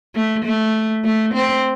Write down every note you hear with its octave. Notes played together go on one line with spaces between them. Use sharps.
A3
A3
A3
C4